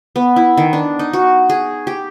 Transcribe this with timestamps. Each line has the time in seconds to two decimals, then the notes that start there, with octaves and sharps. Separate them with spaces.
0.16 B3
0.36 E4
0.57 D#3
0.73 D4
0.99 D#4
1.13 F#4
1.50 G#4
1.87 G4